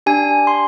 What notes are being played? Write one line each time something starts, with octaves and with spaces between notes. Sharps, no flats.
D4 G4 G#5
C6